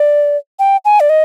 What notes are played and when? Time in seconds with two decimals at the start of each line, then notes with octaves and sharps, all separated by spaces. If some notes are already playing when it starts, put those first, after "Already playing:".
Already playing: D5
0.59 G5
0.85 G#5
1.00 D5
1.09 D#5